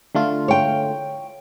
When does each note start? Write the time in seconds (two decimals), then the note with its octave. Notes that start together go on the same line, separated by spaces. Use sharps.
0.15 D3 A3 F4
0.48 C#5 G5